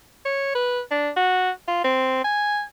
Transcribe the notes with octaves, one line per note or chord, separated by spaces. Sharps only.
C#5
B4
D4
F#4
F4
C4
G#5